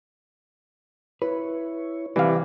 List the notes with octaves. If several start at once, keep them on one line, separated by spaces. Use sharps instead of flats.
E4 B4 C#5
C3 E3 G3 D5 F5